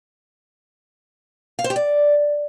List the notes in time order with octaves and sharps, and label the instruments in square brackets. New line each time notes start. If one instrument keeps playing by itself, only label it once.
[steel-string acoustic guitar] F5
C5
G4
D5